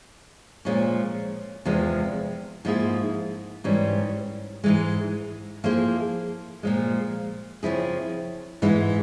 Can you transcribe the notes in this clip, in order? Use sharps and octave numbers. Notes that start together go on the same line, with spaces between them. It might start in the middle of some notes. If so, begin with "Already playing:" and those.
A#2 F3 G#3 C#4
E2 C3 F3 G#3
G#2 F3 A#3 E4 G#4
G#2 E3 G3 C#4
G#2 E3 G#3
F3 A#3 E4 G#4 C5
A#2 F3 G#3
C#3 F3 C4 E4 G#4
G#2 E3 G#3 E4